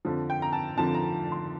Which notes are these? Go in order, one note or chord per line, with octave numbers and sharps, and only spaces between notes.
F2 D3 F3
G5
A#5
A5
F2 D3 F3 A5
A#5
C6